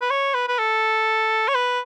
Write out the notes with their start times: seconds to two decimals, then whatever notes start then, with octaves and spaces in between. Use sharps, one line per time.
0.02 B4
0.10 C#5
0.34 B4
0.48 B4
0.59 A4
1.48 C#5
1.55 B4